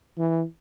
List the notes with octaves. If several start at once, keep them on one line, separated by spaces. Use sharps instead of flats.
E3